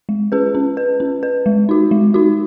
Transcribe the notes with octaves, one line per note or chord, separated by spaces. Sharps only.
G#3
C#4 G#4 B4
C#4
B4
C#4
B4
G#3
D#4 F#4
G#3
D#4 F#4